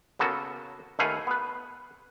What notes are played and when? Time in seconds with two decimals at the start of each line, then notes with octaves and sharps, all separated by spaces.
0.19 C#3 A#3 B3 F#4 A4
0.99 D#2 A3 B4 F5 F#5 G#5
1.27 B3 B4